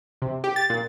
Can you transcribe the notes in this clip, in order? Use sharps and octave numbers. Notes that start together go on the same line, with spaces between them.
C3
G4
A6
A#2